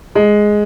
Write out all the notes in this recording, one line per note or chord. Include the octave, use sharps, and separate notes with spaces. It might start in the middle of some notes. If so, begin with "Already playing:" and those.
G#3